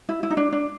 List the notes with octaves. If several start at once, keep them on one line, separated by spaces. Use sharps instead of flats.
E4
E4
D#4
D4
D4